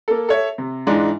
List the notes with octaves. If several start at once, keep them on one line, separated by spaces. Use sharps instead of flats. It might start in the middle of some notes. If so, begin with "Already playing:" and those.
A#3 A4
A4 C#5 E5
C3
G#2 E3 G#3 D4 D#4